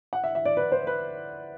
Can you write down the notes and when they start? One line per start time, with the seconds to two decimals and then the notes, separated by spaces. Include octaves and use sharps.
0.13 F#5
0.24 E5
0.35 E5
0.45 D5
0.57 B4
0.72 C5
0.87 B4